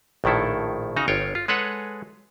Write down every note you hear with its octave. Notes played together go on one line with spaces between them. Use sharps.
A#1 A2 D#3 E4 A4
C#3 D#4 F#4 A#5
G1 F4 C#5 G5
F4
G#3 G#4 A4 B4 C#5 F#5